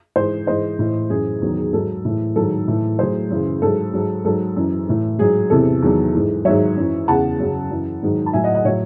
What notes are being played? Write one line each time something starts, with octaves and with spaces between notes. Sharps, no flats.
G#2 E3 G#4 C5
G#2 E3 C5 D#5
A2 E3
F#2 E3 G#4
E2 D#3 F#3
G#2 F#3 A4
A2 E3
G#2 D#3 F#3 A4
A2 E3
A2 F#3 G#4 C5
F#2 C#3 E3
G#2 F#3 A4
G#2 F#3
G#2 F#3 A4
F#2 E3
A2 E3
G#2 F#3 G#4
E2 C3 E3 A4
E2 D#3 F#3
G#2 E3
G#2 D#3 F#3 C#5 E5
F#2 E3
E2 C#3 E3 F#5 A5
F#2 C#3 F#3
F#2 E3
G#2 D#3 F#3
A5
A2 F#3 E5 G#5
D#5 F#5
D#5 F#5
A2 F#3 C#5 E5